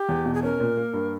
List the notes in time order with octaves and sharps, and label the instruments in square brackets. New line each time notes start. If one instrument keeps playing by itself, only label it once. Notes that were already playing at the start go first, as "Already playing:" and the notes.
Already playing: [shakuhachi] G4
[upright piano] E2
B2
[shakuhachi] G#4
[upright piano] C#4 [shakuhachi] A#4
[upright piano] A#2
A#3
G2